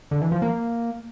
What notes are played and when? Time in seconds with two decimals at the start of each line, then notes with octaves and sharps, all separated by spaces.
0.11 D3
0.22 E3
0.32 F3
0.42 A#3